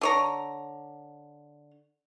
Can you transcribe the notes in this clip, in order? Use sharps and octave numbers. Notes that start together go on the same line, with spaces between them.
D3 C#5 A#5